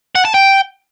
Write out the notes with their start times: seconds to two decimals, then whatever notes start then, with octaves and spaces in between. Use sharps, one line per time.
0.16 F#5
0.25 A5
0.34 G5